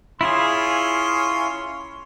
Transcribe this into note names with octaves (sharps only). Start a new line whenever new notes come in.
C#4 E4 F4 G#4 C6